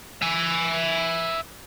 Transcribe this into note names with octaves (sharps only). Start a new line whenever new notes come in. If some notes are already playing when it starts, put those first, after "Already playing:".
E5 G#5